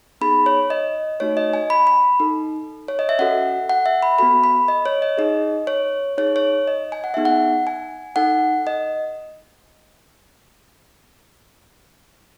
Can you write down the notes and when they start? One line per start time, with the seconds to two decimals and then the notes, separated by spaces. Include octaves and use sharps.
0.21 B3 D#4 G#4 B5
0.46 C#5
0.70 D#5
1.20 A3 D#4 F#4 C#5
1.37 D#5
1.53 G#5
1.70 B5
1.87 B5
2.20 D#4 A4
2.88 C#5
2.99 D#5
3.09 E5
3.19 C#4 F#4 A4 F#5
3.70 F#5
3.86 E5
4.03 B5
4.18 B3 F#4 A4 B5
4.44 B5
4.68 D#5
4.86 C#5
5.02 D#5
5.18 D#4 G#4 D#5
5.67 C#5
6.17 D#4 G#4 C#5
6.36 C#5
6.68 D#5
6.92 G#5
7.04 F#5
7.14 B3 D#4 G#4 E5
7.25 F#5
7.67 G#5
8.16 D#4 A4 F#5
8.67 D#5